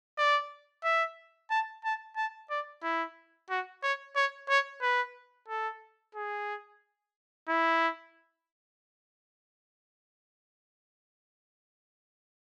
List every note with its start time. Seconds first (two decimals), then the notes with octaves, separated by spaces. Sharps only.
0.18 D5
0.84 E5
1.50 A5
1.84 A5
2.16 A5
2.50 D5
2.83 E4
3.50 F#4
3.83 C#5
4.16 C#5
4.49 C#5
4.82 B4
5.48 A4
6.15 G#4
7.48 E4